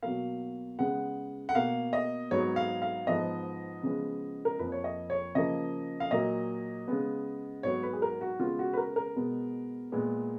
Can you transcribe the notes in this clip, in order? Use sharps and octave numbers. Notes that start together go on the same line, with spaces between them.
B2 F#3 A#3 F5
C#3 G#3 B3 F#5
F#5
B2 A#3 F5
D#5
G#2 F#3 B3 C#5
F5
F5
G#2 F3 B3 D#5
C#3 F3 G#3 B3
A#4
F2 F3 A#3 B4
C#5
D#5
C#5
C#3 F3 A#3 D#5
F5
A#2 F#3 A#3 D#5
C#3 G#3 B3
G#2 F#3 B3 C#5
B4
G#4
A#4
F#4
C#3 G#3 B3 F4
F#4
B4
A#4
A#4
B2 G#3 B3
A#2 G#3 B3